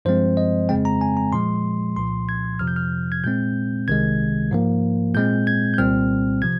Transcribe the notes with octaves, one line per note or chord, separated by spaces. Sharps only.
G2 F3 G#3 C4 C5
D#5
F2 C#3 G#3 C4 G5
A#5
G#5
A#5
A#2 F3 G#3 C6
C2 A#2 F3 C6
G#6
F2 C3 F3 F6
G6
F6
G#6
A#2 G#3 C4 G6
C2 C3 D#3 G#3 G#6
G#2 F3 A#3
A#2 G#3 C4 G6
G#6
G6
C2 A#2 G3 C4 F6
C3 F3 G#6